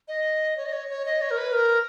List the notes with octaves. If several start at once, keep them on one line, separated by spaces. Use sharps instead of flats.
D#5
C#5
D#5
C#5
C#5
D#5
C#5
A#4
B4
A#4